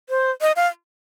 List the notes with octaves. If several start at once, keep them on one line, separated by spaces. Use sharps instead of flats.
C5
D#5
F5